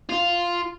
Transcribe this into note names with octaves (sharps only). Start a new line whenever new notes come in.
F4